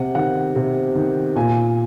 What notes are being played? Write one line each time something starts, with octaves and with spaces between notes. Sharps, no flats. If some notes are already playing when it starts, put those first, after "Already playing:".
Already playing: C3 F#5
D#3 F#5
C3
D#3
A#2 G#5